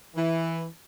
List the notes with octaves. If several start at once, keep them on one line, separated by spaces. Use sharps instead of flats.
E3